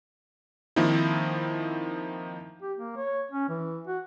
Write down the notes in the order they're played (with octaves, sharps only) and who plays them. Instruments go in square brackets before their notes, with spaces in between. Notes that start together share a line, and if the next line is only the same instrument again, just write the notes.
[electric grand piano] D#3 F3 A#3 C4 D#4 E4
[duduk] G4
A#3
C#5
C#4
E3
F#4